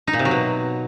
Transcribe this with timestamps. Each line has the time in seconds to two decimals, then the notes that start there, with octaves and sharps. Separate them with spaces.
0.07 D#4
0.13 A#2
0.19 C3
0.25 F#3
0.31 B2